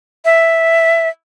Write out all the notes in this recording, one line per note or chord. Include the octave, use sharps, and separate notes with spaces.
E5